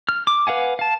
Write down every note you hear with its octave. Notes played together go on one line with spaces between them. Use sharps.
F6
D6
B4 F5 F#5 G#5
F5 A5